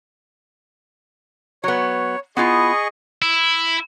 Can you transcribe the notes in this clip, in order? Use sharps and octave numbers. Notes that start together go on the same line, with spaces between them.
F#3 B3 C#5
B3 E4 F4 G#4 D#5 C#6
E4